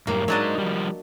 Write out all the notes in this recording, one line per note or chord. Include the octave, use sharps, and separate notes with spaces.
F#2 A2 G3 A#3
F#3 G#3 D4 D#4 D#5
F3 G3